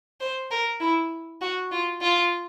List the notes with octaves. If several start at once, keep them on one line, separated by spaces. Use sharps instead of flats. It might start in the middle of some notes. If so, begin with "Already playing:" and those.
C5
A#4
E4
F#4
F4
F4